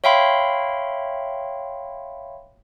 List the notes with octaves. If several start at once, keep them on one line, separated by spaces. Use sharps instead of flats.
C#5 E5 F5 G5 B5 C6